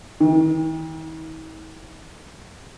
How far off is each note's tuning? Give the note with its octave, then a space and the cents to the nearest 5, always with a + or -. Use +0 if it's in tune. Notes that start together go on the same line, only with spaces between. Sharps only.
D#3 +45